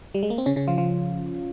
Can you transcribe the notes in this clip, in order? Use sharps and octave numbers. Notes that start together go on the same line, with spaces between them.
G3
G#3
A#3
C4
C#3 C#4
C#3 C#4
F3 F4
F3 F4